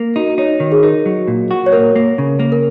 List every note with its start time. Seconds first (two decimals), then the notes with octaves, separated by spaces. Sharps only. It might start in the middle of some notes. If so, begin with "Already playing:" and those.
Already playing: A#3
0.16 D#4 F#4
0.38 D#4 C#5
0.60 D#3
0.72 G#4
0.83 D#4 A#4
1.06 F#3
1.28 A#2
1.51 F#4
1.66 C#5
1.72 A#3 A#4
1.96 A#3
2.18 C#3
2.40 A#3
2.52 A#4